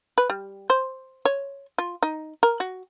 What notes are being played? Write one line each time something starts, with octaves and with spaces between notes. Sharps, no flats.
B4
G3
C5
C#5
F4
D#4
A#4
F#4